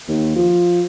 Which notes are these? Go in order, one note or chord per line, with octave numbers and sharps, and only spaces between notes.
D#2
F3